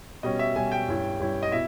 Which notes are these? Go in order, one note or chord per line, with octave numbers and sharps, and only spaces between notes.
B2 G3 C#4 D#5
E5
B2 G3 C#4 G#5
G5
G2 G3 C#4 E4
G2 G3 C#4 E4
D#5
B2 E4 E5